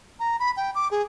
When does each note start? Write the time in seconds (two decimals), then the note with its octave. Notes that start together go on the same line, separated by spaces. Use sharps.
0.20 A#5
0.40 B5
0.57 G5
0.75 D6
0.91 G#4